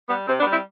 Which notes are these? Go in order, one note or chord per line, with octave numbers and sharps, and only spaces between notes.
G3 B3
C3 C4
B3 D4
G3
C4 E4